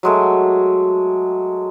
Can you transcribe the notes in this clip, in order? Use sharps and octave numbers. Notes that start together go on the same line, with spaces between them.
F#3 G#3 A3